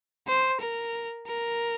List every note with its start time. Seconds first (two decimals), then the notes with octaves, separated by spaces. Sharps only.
0.27 C5
0.61 A#4
1.26 A#4